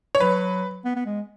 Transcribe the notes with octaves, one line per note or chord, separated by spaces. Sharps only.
C#5
F#3 B4
B3
B3
G#3